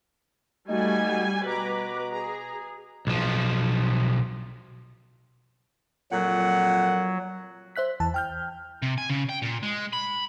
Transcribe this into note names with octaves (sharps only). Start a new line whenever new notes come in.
G3 A3 D#4 F#4 G#5
B2 B4 A#5 D6
G#4 A#5
B1 F3
F2 A#2 F#3 F#5
C5 E5 F#6 B6
E2 E3 A5
G5 F6 G6
C3
G#5
C#3
G5
A#2
G#3
B5